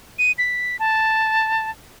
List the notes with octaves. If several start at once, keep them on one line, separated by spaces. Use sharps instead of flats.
D#7
B6
A5